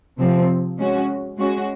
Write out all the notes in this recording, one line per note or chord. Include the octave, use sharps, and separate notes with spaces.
C3 F3 C4
G#3 C#4 F#4
G#3 C#4 F#4